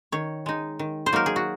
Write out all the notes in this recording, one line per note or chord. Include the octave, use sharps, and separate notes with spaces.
D#3 C#5
G#3 D#4
D#3
C5
F#3 A#3 D#4 A#4
G#4
F#4